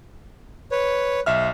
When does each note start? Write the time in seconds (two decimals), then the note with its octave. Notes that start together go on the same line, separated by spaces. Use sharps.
0.71 B4 C#5
1.26 B1 E5 F6